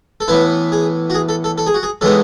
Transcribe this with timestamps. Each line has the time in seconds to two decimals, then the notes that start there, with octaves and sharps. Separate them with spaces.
0.21 A4
0.28 A2 E3 B3 E4 B4
0.72 G#4
1.10 F#4
1.14 G#4
1.29 A4
1.44 A4
1.58 A4
1.67 G#4
1.74 F#4
1.83 G#4
2.01 A2 E3 G#3 B3 D#4 A4